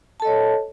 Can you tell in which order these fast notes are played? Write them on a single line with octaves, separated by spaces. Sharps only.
A5 A4 D#5 C#5